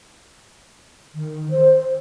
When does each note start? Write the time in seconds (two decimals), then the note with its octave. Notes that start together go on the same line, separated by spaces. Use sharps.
1.15 D#3
1.51 C5